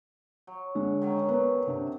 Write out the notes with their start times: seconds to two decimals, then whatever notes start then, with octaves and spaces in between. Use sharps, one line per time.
0.47 F#3
0.75 D3 G#3
1.02 D#3 F#3 C#4
1.29 F#3 B3
1.67 C3 D4